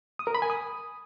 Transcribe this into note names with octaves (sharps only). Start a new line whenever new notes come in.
D#6
A#4
B5
G#5
D#6